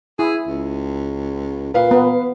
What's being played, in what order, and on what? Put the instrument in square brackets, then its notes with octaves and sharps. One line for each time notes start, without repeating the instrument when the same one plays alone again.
[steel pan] E4 [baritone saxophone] G#4
[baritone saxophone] C#2
[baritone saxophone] A#2 [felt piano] B4 F5
[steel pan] B3